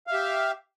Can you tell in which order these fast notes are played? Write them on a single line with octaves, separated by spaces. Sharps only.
F5 E5 G4